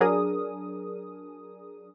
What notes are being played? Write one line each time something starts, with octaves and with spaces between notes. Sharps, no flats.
F#3 D4 G#4 A#4 D#6